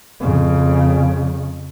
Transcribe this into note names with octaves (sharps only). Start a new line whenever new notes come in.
F2 C#3